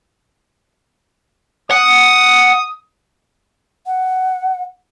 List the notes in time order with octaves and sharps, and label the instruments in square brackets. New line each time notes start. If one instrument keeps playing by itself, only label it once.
[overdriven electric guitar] F#5 [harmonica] D#6
[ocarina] F#5